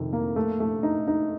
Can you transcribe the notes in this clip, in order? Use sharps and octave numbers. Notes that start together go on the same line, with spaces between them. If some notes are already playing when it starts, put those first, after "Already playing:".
Already playing: F2 C3 D#3
A#3
A3
A3
D#4
D#4